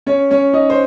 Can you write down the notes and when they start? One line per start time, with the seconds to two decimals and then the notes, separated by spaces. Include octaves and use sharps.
0.06 C#4 C#5
0.30 C#4 C#5
0.53 D#4 D#5
0.70 C5